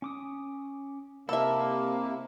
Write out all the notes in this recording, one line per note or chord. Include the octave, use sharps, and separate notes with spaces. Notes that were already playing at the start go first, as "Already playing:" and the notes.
C#4 D6 D#6
C3 A#3 E4 A4 D#5 E5